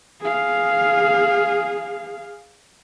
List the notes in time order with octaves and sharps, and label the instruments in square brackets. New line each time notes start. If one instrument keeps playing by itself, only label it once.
[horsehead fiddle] G#4 F5